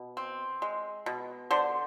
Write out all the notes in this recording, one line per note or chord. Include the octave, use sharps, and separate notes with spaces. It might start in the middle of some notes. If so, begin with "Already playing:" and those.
Already playing: B2
C4
G#3
B2
D3 C5